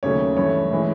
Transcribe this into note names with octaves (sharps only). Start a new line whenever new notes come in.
D#2 C#3 F#3 A3 C#5
G2 E3 A3 C#5
A2 E3 G#3